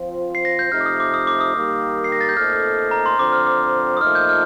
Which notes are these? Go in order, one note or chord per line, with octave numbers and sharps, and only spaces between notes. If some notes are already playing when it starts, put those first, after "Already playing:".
Already playing: F3 C4 F4
C7
A#6
G6
C3 F3 A3 D#4 F6
D6
D#6
D6
D#6
D6
D#6
D#3 G3 A#3
C7
A#6
A6
G6
A#2 A3 C4 D#4 A4 F6
A#5
C6
D3 F3 C4 D6
F6
D6
D#6
A#2 F3 A3 D#4 F6
G6
F6